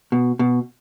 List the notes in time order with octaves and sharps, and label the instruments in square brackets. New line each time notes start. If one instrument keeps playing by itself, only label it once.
[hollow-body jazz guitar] B2
B2